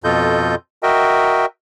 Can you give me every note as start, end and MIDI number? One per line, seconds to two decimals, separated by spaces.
0.04 0.55 41
0.04 0.55 47
0.04 0.55 65
0.04 0.55 69
0.04 0.55 75
0.04 0.55 91
0.83 1.46 66
0.83 1.46 70
0.83 1.46 75
0.83 1.46 76
0.83 1.46 79